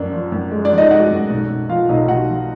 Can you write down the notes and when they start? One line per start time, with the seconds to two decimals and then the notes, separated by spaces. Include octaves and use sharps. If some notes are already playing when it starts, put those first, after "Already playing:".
Already playing: F#2 F3 D4
0.12 F3
0.32 F#2
0.51 G#3
0.65 D4 D5
0.71 F3
0.78 D#4 D#5
0.91 G#3 F#4 F#5
1.11 F#2
1.30 B1
1.50 B1
1.69 F3 F4 F5
1.89 B1 D#4 D#5
2.08 B1 F#4 F#5
2.29 F3